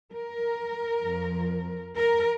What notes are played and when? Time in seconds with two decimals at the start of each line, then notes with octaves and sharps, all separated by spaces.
0.12 A#4
1.04 F2 F3
1.97 A#4